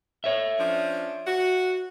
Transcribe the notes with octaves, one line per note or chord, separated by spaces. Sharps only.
C#5 E5
F3 C#4 D4
F#4